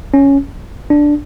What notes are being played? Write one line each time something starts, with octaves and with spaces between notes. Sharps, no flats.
C#4
D4